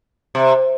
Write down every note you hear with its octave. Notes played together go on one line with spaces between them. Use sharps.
C3